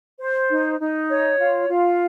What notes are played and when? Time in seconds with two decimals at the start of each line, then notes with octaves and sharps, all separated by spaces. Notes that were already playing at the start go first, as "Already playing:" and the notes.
0.19 C5
0.50 D#4
0.80 D#4
1.09 C#5
1.38 F4
1.68 F4